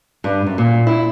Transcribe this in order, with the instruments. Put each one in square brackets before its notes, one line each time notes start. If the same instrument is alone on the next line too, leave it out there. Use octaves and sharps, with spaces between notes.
[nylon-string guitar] G2
F#2
A#2
E4